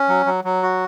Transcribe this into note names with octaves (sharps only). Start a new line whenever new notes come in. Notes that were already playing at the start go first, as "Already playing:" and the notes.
Already playing: C#4
F#3
F#3
F#3
F#4